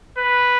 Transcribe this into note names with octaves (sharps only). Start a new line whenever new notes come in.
B4